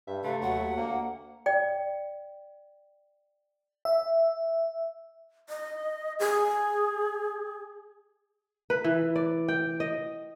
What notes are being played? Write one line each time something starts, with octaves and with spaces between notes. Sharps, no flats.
G2 E5
C3 A3 B4 F5
D#2 F#3 F#5
D2 A#3
D5 G5
E5
D#5
G#4
B4
E3
D5
G5
D#5